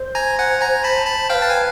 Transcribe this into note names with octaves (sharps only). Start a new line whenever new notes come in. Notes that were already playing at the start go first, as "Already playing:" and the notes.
Already playing: C5
G#5 A#5
F#5 G#5
G#5 A#5
A5 B5
A5 B5
B4 C5 F5 G5
A5
G#5